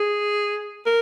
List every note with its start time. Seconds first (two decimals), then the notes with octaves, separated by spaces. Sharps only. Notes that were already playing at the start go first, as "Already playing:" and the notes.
Already playing: G#4
0.86 A#4